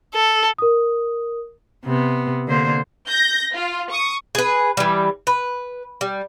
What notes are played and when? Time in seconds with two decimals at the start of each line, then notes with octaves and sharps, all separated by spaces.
0.14 A4
0.58 A#4 D#6
1.85 C3 B3
2.48 D3 A#3 C5
3.08 G6 A#6
3.53 F4
3.90 C#6 D#6
4.35 G#4 B4
4.77 E3 G3
5.27 B4
6.01 G3